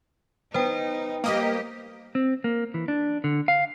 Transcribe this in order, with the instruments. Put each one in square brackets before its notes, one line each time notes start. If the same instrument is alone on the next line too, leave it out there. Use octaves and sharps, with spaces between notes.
[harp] B3 [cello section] D#4 [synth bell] C5 G5
[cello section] G3 G4 [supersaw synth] A#3 D#5
[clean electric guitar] C4
A#3
E3
D4
D3
F5